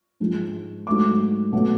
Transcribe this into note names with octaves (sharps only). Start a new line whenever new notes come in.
G#2 F3 G#3
G#2 F#3 A3 D6
B2 F#3 A3